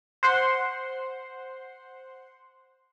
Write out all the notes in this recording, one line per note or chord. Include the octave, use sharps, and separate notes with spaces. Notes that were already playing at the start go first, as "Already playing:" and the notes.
C5 F#5 C6